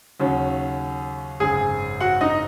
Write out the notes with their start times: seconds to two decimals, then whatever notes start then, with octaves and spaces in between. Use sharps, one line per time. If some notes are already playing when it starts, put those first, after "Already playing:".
0.20 D#2 C#3 F#3 C#4
1.40 G#1 F#2 C#3 G#4 G#5
2.00 F#4 F#5
2.21 D#4 D#5